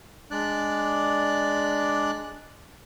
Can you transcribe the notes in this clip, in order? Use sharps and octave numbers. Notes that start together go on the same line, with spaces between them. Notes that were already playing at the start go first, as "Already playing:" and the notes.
G#3 D4 D5 F#6